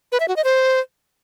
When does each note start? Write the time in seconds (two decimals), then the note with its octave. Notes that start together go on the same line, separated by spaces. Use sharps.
0.12 B4
0.20 E5
0.28 F#4
0.36 D#5
0.44 C5